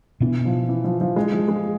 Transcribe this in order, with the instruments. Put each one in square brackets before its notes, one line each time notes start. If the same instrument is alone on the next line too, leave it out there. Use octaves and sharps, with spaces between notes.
[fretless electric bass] B2 B3 D4 [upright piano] E3
[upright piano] F3
E3
F3
F3
G#3
F3
G#3